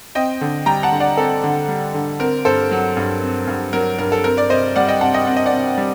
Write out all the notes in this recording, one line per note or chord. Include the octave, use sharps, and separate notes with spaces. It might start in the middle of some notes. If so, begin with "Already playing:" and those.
C4 D#5 G5
D3
G3 G5 A#5
F#5 A5
D3
D5 F#5
C4 A4
D3
G3
D3
C4 A#4
G2 A4 C5
F#3
G2
C4
G2
F#3 A#4
G2 A#4
A4
C4 A#4
A#4 D5
C3 C5 D#5
G3 D5 F#5
D#5 G5
C3 F#5 A5
D#5 G5
C4 F#5
D#5
D5 F#5
C3
G3